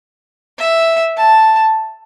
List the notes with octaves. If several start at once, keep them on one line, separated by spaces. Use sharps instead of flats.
E5
A5